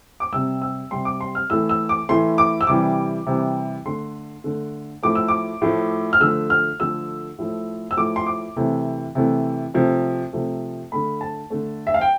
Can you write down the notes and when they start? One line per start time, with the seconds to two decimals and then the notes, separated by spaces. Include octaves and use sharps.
0.20 D6
0.32 C3 G3 E6
0.62 E6
0.91 C3 G3 C6
1.05 D6
1.21 C6
1.35 F6
1.50 A2 E3 A3 E6
1.69 E6
1.89 D6
2.09 A2 E3 A3 C6
2.38 D6
2.61 E6
2.67 C3 E3 G3 D6
3.27 C3 E3 G3
3.86 D3 A3 C6
4.44 D3 A3
5.03 A2 F3 A3 D6
5.15 E6
5.28 D6
5.62 A2 F3 A3
6.13 F6
6.20 D3 F3 A3 E6
6.50 F6
6.79 D3 F3 A3 E6
7.39 A2 F3 A3
7.91 E6
7.97 A2 F3 A3 D6
8.16 C6
8.26 D6
8.56 C3 E3 A3
9.15 C3 E3 A3
9.74 C3 F3 A3
10.33 C3 F3 A3
10.92 D3 A3 B5
11.21 A5
11.50 D3 A3
11.87 E5
11.94 F5
12.01 G5